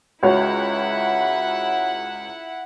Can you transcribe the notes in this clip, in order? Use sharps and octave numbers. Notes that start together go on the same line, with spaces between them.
C#2 E4 F#4 C#5 F#5